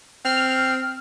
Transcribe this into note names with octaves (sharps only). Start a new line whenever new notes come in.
C4 F6